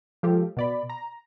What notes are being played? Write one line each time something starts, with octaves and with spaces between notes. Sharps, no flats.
F3 G#3 F4 G4 A4
B2 D5 B5
A#5